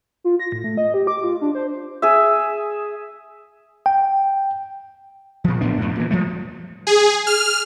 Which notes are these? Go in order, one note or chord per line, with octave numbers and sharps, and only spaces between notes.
F4
A#6
A2
A3
D#5
G4
D6
F4
D4
C5
G#4 E5
G5
A#2 F3
A2 B3 D4
F2 A2
A#2 E3
F3 G3 A3
G#4
F6